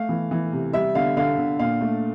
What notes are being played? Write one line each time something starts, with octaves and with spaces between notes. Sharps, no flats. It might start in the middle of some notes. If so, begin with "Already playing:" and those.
Already playing: A3 F5
E3
E3
C3
G3 E5
D3 F5
D3 F5
D3
A#2 F5
A3